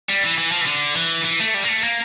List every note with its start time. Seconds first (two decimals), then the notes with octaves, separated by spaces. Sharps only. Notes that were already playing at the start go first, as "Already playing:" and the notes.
0.09 G3
0.24 E3
0.38 E3
0.52 F3
0.61 E3
0.66 D3
0.96 E3
1.25 E3
1.40 A3
1.54 G3
1.64 A#3
1.68 A3
1.83 A#3